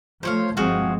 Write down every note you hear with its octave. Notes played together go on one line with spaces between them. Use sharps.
F3 A3 C5 C#5 F5
G1 F3 G#3 C4 F#4 G#4 F5